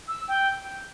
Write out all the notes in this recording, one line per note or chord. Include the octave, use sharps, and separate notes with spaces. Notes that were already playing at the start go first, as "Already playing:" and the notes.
E6
G5